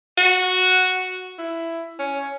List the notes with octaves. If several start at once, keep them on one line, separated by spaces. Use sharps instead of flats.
F#4
E4
C#4